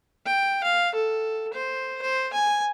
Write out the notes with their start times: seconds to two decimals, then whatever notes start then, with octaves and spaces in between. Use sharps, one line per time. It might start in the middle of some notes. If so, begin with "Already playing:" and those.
0.26 G5
0.63 F5
0.95 A4
1.53 C5
2.02 C5
2.33 G#5